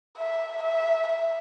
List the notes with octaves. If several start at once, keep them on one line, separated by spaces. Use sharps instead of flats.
E5
E5
E5